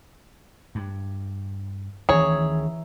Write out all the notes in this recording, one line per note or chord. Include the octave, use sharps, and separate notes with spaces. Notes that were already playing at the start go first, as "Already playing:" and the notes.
G2
D2 D#3 E3 C#4 G#4 C#5 E5 A#5